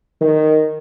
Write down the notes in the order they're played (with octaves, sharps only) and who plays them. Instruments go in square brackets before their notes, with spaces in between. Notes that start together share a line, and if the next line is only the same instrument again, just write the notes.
[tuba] D#3